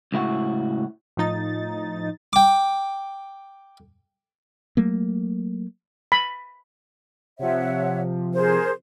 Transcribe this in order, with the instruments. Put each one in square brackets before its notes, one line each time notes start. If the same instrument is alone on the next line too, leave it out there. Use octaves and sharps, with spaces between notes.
[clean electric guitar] C#2 A2 E4 F#4
[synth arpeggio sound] A2 F3 D#4 A6
[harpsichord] G5 D6
[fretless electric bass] F#3 A3 A#3
[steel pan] B5
[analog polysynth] C3 F3 [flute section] C#5 E5 F#5
[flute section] G#4 A#4 C5